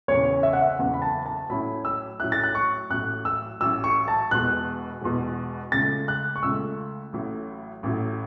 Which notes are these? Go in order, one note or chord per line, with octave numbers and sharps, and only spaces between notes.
F#1 E2 C#3 C#5
E5
F#5
E5
F#1 E2 C#3 F#5
B5
A5
A5
A2 F#3 C#4 E4 B5
E6
A2 F#3 C#4 E4 F#6
A6
F#6
C#6
A1 A2 F#3 F#6
E6
A1 A2 F#3 E6
C#6
A5
E1 E2 B2 F#6
E1 E2 B2
C#2 C#3 A3 A6
F#6
C#6
C#2 C#3 A3 E6
A1 A2 F#3
A1 A2 F#3